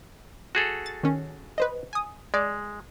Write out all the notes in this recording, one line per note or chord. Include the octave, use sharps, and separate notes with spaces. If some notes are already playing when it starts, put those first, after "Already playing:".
F#4 G#4 A4
A6
D#3 C#4
B4 C5 D#5
G#5 D#6
G#3 D5